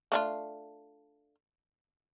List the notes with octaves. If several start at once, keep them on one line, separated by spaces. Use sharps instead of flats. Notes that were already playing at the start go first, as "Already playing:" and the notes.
A3 D4 F4